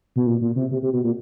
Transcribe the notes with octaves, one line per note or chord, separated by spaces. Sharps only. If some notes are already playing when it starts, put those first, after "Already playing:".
B2
A#2
A#2
C3
C3
C3
B2
A#2